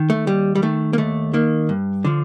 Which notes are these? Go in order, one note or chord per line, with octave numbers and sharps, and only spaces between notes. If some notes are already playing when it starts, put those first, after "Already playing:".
Already playing: D#3
A3
D#2 G3
G3
D#3 A3
A#3
D#2 A3
D#3 A#3
G2
D3 F3